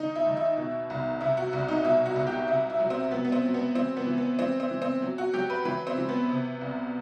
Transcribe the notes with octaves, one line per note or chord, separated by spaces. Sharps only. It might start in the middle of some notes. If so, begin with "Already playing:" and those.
Already playing: D#3 D#4
E4
D#2
E4
B2
C2
C3 E4
F#4
C2
D#4
B2 E4
F#4
C2
G4
C3 E4
E4
F#3
C4
F#3 B3
B3
C4
F#3
B3
E3 C4
B3
E3
B3
E3 C4
C4
E3
C4
F#3
F#4
F#3 G4
B4
E3 B4
C4
E3
B3
C3
C2